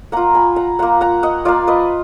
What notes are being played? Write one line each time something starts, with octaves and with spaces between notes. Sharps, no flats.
A#3 F4 F#5 A#5
G#5 B5
F#5 A#5
A#3 F4 F#5 A#5
F#5 A#5
D#5 F#5
A#3 F4 D5 F5
B4 D#5